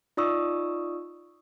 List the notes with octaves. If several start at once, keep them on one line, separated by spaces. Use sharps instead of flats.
D#4 F4 D5 C#6 D#6 E6